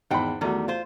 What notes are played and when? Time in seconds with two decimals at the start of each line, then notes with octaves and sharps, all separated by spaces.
0.11 G#1 E2 C5 F#5 G5 B5
0.41 E2 D#3 G3 A3 F#4
0.68 F4 C5